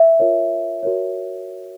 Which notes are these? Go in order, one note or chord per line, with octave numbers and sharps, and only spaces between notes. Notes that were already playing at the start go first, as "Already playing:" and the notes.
Already playing: E5
F4 A#4 C#5
F#4 A#4 C#5